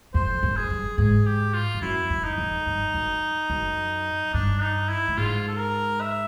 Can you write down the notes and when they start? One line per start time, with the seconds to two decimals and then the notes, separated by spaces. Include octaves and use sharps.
0.14 F2 C5
0.43 F#2
0.56 G#4
0.70 G2
0.98 G#2 G#4
1.26 G4
1.54 F4
1.75 G2
1.82 F#2 E4
2.10 F#2
2.24 D#4
2.38 F2
2.66 G2
2.94 F#2
3.50 F#2
4.33 G2 D4
4.61 D#4
4.89 E4
5.08 A2
5.17 G#2 F4
5.48 A4
5.59 A#4
6.01 E5